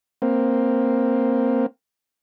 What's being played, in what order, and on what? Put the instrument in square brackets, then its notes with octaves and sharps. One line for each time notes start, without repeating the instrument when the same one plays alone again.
[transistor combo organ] A#3 C4